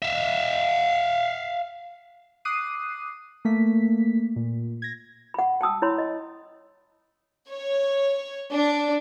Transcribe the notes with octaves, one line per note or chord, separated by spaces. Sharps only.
E5 F5
D6 D#6 F#6 C7 D#7
A3 A#3 B6
A#2
G#6 A#6
F#5 B5
G5 A5 D#6 E6
E4 C#5 B5 C6
D#5
C#5
D4